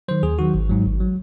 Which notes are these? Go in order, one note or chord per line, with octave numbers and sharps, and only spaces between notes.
D#3 F#3 C5
D#2 G#4
D#3 F#3 F#4
G#1
G#2 F#3
G#1
F#3